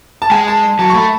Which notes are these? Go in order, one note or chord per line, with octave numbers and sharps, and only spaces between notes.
A5
G#3 G#5
A5
F#3 A5
C#6
A3 B5